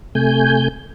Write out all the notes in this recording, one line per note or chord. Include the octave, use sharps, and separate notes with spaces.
C3 A3 G#5 G6